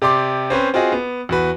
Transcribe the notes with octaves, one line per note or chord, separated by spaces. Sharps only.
C3 G4 D5 C6 D6
C4 C#4 B4 C5
C4 F4 F#4 G#4 D#5
B3
E2 F#4 B4